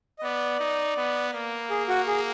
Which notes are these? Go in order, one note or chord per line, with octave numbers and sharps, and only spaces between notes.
D#5
B3 D5
D#4
B3
A#3
G#4
F#4
G#4